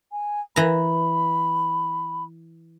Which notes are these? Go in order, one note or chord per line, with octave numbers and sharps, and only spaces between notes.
G#5
E3 A#5 B5